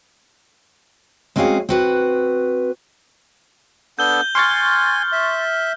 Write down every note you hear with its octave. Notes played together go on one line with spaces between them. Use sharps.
G#3 C4 C#4 F#4 G#4 F5
C4 F#4 B4
B3 D4 A4 G6 G7
G#5 C6 C#6 F6 A6
E5